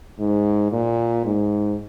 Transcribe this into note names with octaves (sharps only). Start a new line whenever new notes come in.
G#2
A#2
G#2